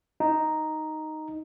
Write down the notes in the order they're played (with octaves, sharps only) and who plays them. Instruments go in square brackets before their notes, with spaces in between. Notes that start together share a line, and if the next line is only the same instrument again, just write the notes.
[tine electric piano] D#4